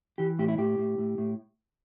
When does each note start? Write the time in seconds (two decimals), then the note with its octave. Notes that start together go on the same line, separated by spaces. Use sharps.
0.18 E3 G4
0.39 A2 G4
0.48 E4
0.58 A2 G4
0.78 A2
0.98 A2
1.18 A2